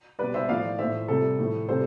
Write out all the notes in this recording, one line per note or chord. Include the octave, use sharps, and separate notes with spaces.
B2 G3 B4 D5
C5 E5
A2 F3 D5 F5
A2 F3 C5 E5
C3 G3 A4
A2 F3
C3 G3 A4 C5